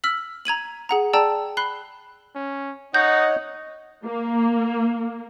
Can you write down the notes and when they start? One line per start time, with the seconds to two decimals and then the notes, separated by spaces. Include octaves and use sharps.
0.04 E6 F6 B6 F#7
0.45 A#5 G#6 D#7 F#7
0.89 G#4 F#5 A#5
1.13 G#4 D5 G5 A5 A#5 E6
1.57 B5 F#6 C7 G7
2.35 C#4
2.94 D#4 C#5 D#5 F#5 G6
4.04 A#3